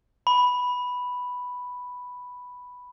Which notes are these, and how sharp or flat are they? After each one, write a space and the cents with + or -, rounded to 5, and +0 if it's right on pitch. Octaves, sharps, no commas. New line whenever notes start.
B5 +0